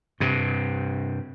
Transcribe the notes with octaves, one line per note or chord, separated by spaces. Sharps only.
G2 C3